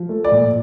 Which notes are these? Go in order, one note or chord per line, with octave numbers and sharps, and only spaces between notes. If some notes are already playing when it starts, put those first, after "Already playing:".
Already playing: F3
A3
D5
A#2